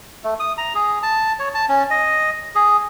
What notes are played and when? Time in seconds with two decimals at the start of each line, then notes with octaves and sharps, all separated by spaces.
0.24 A3
0.40 D#6
0.58 A#5
0.75 G#4
1.03 A5
1.39 C#5
1.54 A5
1.69 C#4
1.90 D#5
2.55 G#4